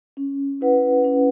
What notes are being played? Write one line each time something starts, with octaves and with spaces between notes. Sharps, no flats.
C#4
E4 B4 F#5
C#4